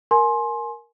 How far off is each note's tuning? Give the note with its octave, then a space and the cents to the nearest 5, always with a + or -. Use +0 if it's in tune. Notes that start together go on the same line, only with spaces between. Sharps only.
A#4 +0 G#5 +25 C6 +15